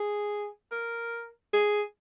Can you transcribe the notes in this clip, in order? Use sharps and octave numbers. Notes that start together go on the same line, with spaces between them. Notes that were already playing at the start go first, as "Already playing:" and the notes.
Already playing: G#4
A#4
G#4